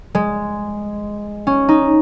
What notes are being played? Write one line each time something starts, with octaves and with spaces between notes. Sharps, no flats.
G#3
C#4
D#4